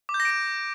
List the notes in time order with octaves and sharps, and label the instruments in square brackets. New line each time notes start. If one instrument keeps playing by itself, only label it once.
[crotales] D6
G6
A#6
D7
A#6